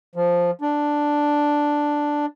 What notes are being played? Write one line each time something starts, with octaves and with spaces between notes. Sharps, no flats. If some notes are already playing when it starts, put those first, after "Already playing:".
F3
D4